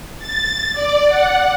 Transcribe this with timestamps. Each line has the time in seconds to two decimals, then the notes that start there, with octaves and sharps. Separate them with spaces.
0.19 A6
0.73 D5
1.07 F#5